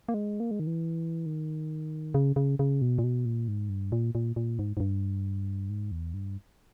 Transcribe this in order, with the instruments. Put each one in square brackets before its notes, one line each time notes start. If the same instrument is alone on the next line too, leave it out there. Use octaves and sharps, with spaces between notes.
[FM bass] A#3
G#3
A#3
G#3
D#3
E3
D#3
C#3
C#3
C#3
B2
A#2
B2
A#2
G#2
G2
A#2
A#2
A#2
G#2
G#2
G2
G#2
E2
G2